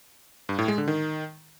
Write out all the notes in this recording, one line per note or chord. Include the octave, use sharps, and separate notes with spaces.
G2
A2
G#3
D3
D#3